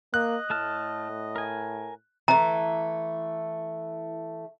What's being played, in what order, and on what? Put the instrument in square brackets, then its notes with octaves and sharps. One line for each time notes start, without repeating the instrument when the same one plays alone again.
[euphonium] A#3 [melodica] D#5 [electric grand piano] F#6
[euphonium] A2 [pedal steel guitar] A3 A5 F6
[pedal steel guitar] A#4 G#5
[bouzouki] E3 A3 [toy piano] A#5